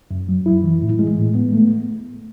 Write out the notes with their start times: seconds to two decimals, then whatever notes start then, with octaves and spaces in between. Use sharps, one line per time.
0.11 F#2
0.29 F#3
0.46 E4
0.64 E3
0.82 A2
0.99 G#3
1.17 A2
1.35 B3
1.53 A3